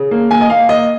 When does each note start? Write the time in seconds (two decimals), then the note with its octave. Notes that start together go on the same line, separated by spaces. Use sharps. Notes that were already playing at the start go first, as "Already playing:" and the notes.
Already playing: C#3
0.11 A#3
0.31 A#3 G#5
0.41 D#5
0.50 A#3 F5
0.69 A#3 D#5